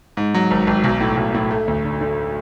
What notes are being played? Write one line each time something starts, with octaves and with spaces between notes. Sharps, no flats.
G#2
F#3
G#1
G#1
B1
A2
B1
A2
A3
D2
D3
D3